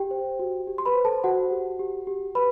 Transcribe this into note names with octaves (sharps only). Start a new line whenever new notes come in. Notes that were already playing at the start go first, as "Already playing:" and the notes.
Already playing: G4 G5
C5
F#4
G4
C6
B4 B5
C5
A4 A5
F#4 C5 F#5
G4
G4
G4
B4 B5